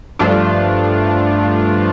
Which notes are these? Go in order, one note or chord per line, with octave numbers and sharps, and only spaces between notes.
G2 F3 A3 D4 F4